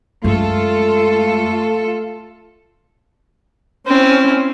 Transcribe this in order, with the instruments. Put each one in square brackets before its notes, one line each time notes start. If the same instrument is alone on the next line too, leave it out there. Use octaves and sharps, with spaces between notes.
[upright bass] F#2 G#3 [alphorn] A3 [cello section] F4 A4
[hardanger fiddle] C4 E4 [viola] C#4